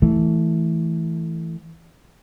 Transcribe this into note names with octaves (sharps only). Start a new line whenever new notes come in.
E3 A3